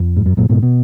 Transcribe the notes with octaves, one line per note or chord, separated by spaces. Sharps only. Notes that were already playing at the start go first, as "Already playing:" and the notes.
Already playing: F2
G#2
F#2
F#2 A#2
G#2 B2
B2